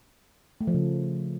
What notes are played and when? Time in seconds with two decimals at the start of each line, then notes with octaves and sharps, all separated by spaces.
0.61 A3
0.67 F3
0.74 C#3